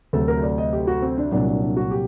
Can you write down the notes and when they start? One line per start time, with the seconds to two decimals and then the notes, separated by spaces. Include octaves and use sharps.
0.13 D2 C3 F#3 A3 A4
0.28 A#4
0.43 D5
0.58 D#5
0.73 G4
0.87 F#4
1.02 C4
1.18 D4
1.31 C2 A#2 F#3 D4
1.47 D4
1.62 D4
1.77 F#4
1.91 G4